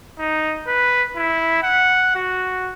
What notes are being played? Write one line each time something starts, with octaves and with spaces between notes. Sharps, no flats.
D#4
B4
E4
F#5
F#4